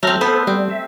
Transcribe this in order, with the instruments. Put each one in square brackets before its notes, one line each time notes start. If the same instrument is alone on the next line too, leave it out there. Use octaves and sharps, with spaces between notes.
[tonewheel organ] F#3 A#5 F6 [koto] A3 C4
[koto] B3 B4 [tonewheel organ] A4 C5
[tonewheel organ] G3 [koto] C4
[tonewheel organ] E5